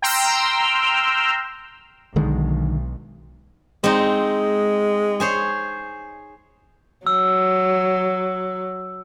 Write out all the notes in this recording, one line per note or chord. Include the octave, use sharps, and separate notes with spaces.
G5 A#5 C6 E6 F6
B1 D3 D#3 G#3
G#3 C4 D#4
G#4 C5 C#5
F#3 E6